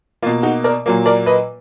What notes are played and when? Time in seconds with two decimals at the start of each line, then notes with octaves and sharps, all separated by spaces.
0.22 A#3 F4
0.26 B2
0.43 D#4 F#4
0.64 A#4 D5
0.86 A#2 F#3 A#3
1.06 A#4 D5
1.26 B4 D#5